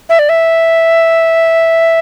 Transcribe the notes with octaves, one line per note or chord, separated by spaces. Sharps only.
E5
D5
E5